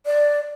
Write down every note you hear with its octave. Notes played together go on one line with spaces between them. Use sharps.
D5